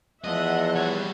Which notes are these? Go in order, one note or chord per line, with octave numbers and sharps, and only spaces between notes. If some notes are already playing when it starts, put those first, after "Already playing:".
E2 F3 D#5 E5 F#5
G3 C#5